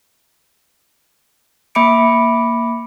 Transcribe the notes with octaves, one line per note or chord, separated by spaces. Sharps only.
A#3 E5 B5 D6 C#7 D7